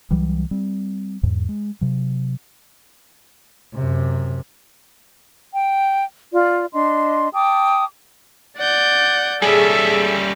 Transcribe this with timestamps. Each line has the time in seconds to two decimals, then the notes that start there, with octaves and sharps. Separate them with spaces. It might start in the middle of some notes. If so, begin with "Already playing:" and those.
0.11 C2 E3 F#3 G3
0.51 G3 C4
1.23 E2 G#2
1.49 G#3
1.81 C3 F#3
3.74 F#2 C3
5.53 G5
6.33 F4 D5
6.74 D4 D#5 C6
7.33 G5 A5 D6 D#6
8.58 D5 F#5 G6
9.42 G3 C#4 G#4 A4 E5